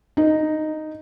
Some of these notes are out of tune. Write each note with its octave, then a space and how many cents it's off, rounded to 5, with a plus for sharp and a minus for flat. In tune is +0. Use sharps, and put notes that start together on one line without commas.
D#4 -5